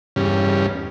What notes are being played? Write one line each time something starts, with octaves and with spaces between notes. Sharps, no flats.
E2 G2 C#3 G3 C#4